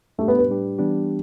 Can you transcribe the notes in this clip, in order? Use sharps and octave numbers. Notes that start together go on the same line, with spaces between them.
A2 G3 A3 D4 G4
B3
B4
A2 G3 D4 G4
E3 G3 B3 D4 G4